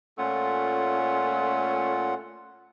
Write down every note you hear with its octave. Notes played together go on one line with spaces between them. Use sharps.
A#2 A3 C#4 F4 F#5